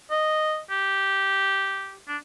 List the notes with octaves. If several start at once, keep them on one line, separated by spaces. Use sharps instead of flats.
D#5
G4
D4